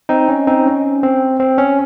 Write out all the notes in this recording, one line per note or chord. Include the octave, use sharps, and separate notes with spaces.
C4 D#4
C#4
C4 D#4
C#4
C4
C4
C#4